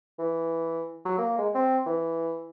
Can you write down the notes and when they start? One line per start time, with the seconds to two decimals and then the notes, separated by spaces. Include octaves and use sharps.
0.19 E3
1.05 F#3
1.18 A#3
1.38 G#3
1.55 C4
1.86 E3